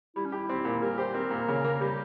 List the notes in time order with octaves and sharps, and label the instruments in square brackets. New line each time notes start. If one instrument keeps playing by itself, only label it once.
[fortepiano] G3 [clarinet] E4
[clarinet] C#4
[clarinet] E4 [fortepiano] G4
[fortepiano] C4
A#2
[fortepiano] G3 [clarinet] A#4
[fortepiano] G4 [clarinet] C5
[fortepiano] C4 [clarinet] A#4
[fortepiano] A#2
C#3
A#3
[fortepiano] G3 [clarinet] G4